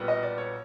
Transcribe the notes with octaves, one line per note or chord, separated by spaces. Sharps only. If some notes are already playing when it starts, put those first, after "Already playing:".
Already playing: B1 A#2 G3 B3
D#5
D5
C#5